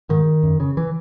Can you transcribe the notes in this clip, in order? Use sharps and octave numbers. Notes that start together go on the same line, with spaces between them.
G#2 D#3
F#2
C#3
E3